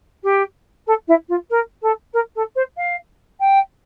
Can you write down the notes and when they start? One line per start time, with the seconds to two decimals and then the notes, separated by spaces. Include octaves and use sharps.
0.23 G4
0.87 A4
1.07 E4
1.29 F4
1.50 A#4
1.82 A4
2.13 A#4
2.35 A4
2.55 C5
2.77 F5
3.40 G5